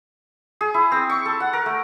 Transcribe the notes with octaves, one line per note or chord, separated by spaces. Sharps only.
G#4
E4
C4
C#6
A4
F#5
A#4
A3